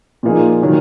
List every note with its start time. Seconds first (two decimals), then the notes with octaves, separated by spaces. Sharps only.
0.23 A#2 F3 A#3 D#4 G#4
0.63 D#3 F#3 A#3